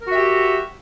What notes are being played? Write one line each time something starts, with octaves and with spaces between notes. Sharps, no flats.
F#4 G4 A#4 E5